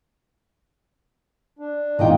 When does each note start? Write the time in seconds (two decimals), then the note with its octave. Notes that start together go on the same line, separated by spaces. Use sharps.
1.59 D4
1.99 G#1 A2 E3 D#4 F4 D#5 G5